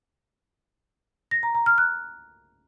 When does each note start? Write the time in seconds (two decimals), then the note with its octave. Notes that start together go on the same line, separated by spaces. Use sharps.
1.31 A#6
1.43 A#5
1.55 A#5
1.66 F6
1.78 F#6